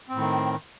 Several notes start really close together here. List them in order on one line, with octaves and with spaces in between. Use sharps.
C4 A2 D#3